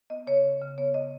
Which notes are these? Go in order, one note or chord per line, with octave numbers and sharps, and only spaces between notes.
B3 D#5
C#3 C#5
C#3
C#3
B3 C#5
D#5